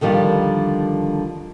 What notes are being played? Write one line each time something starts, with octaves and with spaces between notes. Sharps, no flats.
D3 D#3 F3 G3